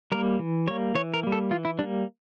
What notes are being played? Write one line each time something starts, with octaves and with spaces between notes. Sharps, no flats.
G3 A#3 A#4
E3
G3 A#3 C#5
E3 C#5
A#4
G3 A#3
A4
E3 F4
E4
G3 A#3 D4